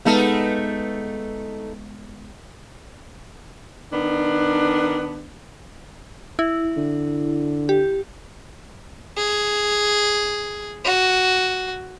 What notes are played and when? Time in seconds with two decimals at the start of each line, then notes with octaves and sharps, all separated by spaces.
0.05 G#3 A3 B3 D#4 A4 F5
3.92 D#3 B3 D4
6.39 E4
6.77 D3
7.69 G4
9.18 G#4
10.85 F#4